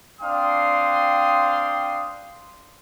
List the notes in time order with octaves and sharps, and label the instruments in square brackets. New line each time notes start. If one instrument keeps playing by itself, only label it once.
[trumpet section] C4 D4 F5 G5 C6 D#6